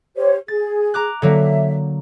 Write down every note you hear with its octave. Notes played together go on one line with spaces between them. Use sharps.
G4 C5 C#5
G#4 A6
A#5 D6 F#6
D3 F#3 A#3 E5